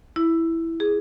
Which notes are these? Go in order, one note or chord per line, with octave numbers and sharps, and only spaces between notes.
E4
G#4